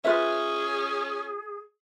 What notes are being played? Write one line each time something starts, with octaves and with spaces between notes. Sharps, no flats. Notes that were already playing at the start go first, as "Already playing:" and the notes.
C#4 F4 G#4 B4 E5